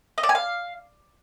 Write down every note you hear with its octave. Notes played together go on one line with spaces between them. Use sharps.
D#5
D5
G#5
F5